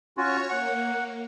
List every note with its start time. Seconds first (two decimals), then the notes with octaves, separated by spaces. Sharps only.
0.17 C#4 F4 F#4 C#5 C#6
0.50 A#3 F#5